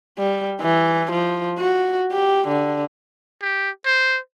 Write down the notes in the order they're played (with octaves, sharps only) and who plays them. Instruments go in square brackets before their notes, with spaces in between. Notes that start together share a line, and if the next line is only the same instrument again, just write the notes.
[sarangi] G3
E3
F3
F#4
G4
D3
[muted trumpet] G4
C5